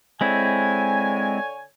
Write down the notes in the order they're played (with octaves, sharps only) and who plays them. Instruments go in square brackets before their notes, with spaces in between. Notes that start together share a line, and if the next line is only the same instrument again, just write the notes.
[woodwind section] D3 C#5 G#5 [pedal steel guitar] G#3 C4 E4